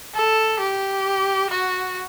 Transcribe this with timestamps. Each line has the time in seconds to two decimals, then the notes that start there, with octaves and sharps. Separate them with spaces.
0.15 A4
0.60 G4
1.50 F#4